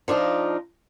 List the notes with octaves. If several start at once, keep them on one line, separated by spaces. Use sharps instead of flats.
F3 D4 D#4 F4